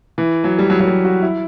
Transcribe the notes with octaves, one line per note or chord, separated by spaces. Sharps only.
E3
F#3
G3
F#3
F#3
G3
F#4
E4